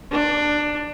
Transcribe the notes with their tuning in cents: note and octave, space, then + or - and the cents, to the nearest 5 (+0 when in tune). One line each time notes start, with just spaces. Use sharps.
D4 +15